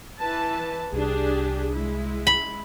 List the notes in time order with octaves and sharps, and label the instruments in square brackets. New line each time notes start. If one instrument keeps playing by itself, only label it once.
[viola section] E3 B4 A5
[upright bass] C2 [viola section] D4 G4 G#4
[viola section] G#3 E4
[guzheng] B5